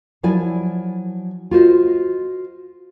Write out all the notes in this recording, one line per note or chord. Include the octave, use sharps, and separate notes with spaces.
F3 F#3 E4 D5 G#5
F4 F#4 C5 D#5